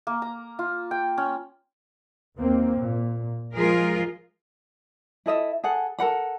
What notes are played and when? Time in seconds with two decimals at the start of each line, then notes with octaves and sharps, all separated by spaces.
0.07 A#3
0.22 A#5
0.59 F4
0.91 G5
1.18 C#4
2.37 D#2 A#3 C4
2.78 A#2
3.54 F3 G#3 F4 G#4 A#4
5.26 E4 A4 D#5 E5
5.64 G#4 A4 F#5
5.99 A4 A#4 F#5 B5